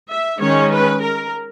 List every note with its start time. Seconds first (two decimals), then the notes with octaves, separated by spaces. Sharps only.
0.09 E5
0.40 D#3 G#3 C#4 C#5
0.72 B4
1.02 A#4